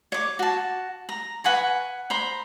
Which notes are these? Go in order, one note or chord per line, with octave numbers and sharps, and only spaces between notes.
C#5 D6
F#4 A5
A#5
B4 F#5 G#5 C#6
C5 A#5 B5